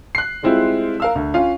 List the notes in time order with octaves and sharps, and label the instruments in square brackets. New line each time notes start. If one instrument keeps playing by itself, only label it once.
[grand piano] F#6 C7
G3 G#3 C4 E4 F4
A#4 F5 E6
D2
C#4 F4 F5